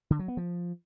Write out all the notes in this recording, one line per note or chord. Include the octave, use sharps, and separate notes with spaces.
D3
F#3
B3
F3